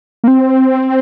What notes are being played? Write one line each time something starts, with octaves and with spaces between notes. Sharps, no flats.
A#3
C4